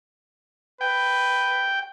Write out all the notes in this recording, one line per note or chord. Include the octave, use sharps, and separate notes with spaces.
B4 G5